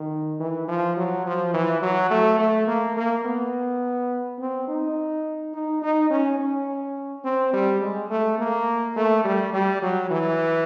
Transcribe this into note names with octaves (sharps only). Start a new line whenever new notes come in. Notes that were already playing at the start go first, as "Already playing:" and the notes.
Already playing: D#3
E3
F3
F#3
F3
E3
F#3
A3
A3
A#3
A#3
B3
C4
D#4
D#4
D#4
C#4
C#4
C4
G3
G#3
A3
A#3
A3
G3
G3
F#3
E3